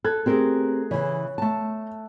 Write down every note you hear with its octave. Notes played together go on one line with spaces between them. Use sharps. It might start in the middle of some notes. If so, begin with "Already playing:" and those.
A4 F#6 G#6
A3 C4 G4 G#4 A#4
C#3 E3 C#5
A3 A5